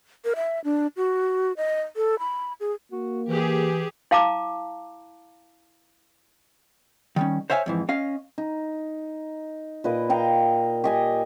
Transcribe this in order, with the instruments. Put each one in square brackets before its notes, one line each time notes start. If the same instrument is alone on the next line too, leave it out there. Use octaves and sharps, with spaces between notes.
[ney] A#4
E5
D4
F#4
D#5
A4
B5
G#4
[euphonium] A#3 [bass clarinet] F#4
[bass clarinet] E3 [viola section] G4 G#4
[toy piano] E4 F5 A5 A#5 D6
[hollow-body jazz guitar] D#3 G3 C#4
C5 C#5 E5 F5 G#5
F2 G#2 E3
C#4 D#5 F5
[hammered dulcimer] D#4
A#2 B4 D#5 D6
D#5 F5 G5 A#5
G4 D#5 G#5